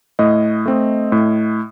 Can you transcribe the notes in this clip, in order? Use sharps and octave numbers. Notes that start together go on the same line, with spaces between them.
A2 D#5
A3 C4
A2